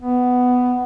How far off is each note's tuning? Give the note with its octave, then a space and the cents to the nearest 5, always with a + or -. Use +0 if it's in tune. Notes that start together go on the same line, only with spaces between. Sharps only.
B3 +10